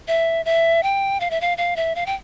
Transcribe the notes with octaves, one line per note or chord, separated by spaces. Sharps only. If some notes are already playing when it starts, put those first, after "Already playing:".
E5
E5
G5
F5
E5
F5
F5
E5
F5
G5